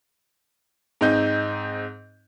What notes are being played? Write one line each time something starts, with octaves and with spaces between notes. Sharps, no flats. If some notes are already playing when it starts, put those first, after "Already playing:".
G#2 C4 D#4 G6